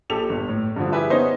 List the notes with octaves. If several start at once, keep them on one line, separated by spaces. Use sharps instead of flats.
A#1 G4 A4 F7
G1
A2
G2 D3 F3
E4 G4 G#4 B4 E5
B3 C#4 D#4 C5